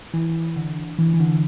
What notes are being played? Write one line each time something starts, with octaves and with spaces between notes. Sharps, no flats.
E3
D3
E3
E3
D3